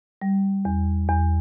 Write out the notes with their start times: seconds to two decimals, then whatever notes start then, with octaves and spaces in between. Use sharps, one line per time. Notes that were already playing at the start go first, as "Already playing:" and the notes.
0.22 G3
0.65 E2
1.09 E2